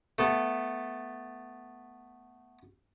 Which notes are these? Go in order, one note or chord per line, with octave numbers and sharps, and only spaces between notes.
A3 B3 A4